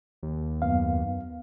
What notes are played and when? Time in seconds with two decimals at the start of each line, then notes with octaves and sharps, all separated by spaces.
0.23 D#2
0.62 F#2 B3 F5